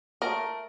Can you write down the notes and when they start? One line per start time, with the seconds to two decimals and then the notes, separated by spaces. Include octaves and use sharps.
0.22 A3 A#4